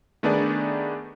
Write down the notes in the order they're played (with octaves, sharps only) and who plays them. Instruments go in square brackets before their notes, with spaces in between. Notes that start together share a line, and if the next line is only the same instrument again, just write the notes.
[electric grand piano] D#3 A3 B3 D4 G#4 D5